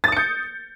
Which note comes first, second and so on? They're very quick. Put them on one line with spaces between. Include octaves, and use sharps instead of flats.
A6 D#6 C#7 G6